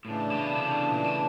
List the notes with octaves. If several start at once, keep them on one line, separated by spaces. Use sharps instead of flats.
A2 C#3 E3 A3 D4
B2
C3
B2
A#2
B2